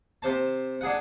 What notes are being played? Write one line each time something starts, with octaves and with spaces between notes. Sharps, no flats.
C3 C5 A5
D4 G#4 F#5